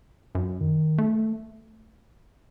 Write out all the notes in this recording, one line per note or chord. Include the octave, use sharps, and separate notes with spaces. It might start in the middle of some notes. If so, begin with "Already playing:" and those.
F#2
D#3
A3